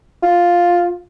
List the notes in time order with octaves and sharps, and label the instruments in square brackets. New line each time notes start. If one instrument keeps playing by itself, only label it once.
[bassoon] F4